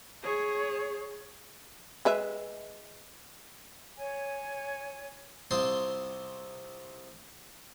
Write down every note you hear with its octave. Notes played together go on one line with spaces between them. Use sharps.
G#4 C#5
G#3 B4 E5
C#5 G#5
C2 C4 F4 C6 D#6